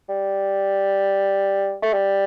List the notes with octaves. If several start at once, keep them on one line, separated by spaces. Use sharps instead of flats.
G3
A3
G3